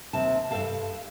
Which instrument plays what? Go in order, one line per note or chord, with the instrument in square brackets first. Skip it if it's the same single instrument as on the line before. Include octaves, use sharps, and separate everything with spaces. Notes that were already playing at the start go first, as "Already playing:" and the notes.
[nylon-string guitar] D#2 C3 A5
G2 C#3 A4 F5 A5